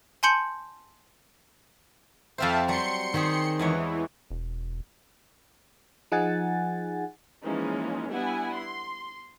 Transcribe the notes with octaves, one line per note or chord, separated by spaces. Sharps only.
G#5 A5 C6 G6 C#7 F#7
F2 C4 C5 E5 F5 A5
F#3 G3 C6 C#7
D#3 C4 G4 G#4
E2 E3 G#3 C#5
E1
F3 D#4 G#4 F#5 G#5 A6
E3 F3 G#3 A#3 C#4 D#4
G3 B3 D4 E4 F#5 G#5
C6